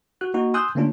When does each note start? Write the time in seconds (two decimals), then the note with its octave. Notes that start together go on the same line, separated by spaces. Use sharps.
0.21 F#4 F#6
0.34 A#3 D#4 F#4
0.54 G#5 C6 D#6 E6 F#6 G6
0.75 D3 A3 A#3 C#4 D4 F4